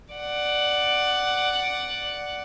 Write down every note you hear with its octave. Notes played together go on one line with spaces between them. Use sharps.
D5 F#5